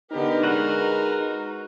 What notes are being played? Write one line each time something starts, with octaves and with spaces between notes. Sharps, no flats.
D3 B3 D#4 G4 A#4
G#3 D#4 F#4 B4 F#5